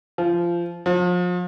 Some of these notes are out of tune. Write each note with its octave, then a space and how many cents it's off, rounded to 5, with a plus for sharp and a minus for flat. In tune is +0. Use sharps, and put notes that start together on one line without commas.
F3 -20
F3 +35